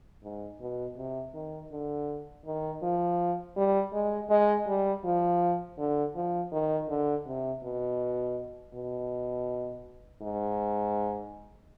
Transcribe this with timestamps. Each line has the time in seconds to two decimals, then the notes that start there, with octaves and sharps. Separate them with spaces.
0.24 G#2
0.61 B2
0.97 C3
1.34 D#3
1.72 D3
2.46 D#3
2.82 F3
3.57 G3
3.93 G#3
4.30 G#3
4.67 G3
5.04 F3
5.78 D3
6.15 F3
6.52 D#3
6.89 D3
7.26 C3
7.63 B2
8.74 B2
10.22 G#2